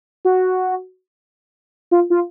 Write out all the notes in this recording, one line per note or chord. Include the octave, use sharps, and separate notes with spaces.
F#4
F4
F4